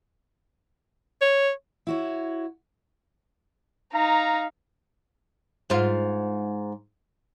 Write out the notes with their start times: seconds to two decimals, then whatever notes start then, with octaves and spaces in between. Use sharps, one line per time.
1.22 C#5
1.87 E4 F#4 C#5
3.93 D#4 F5 A#5
5.70 G#2 F4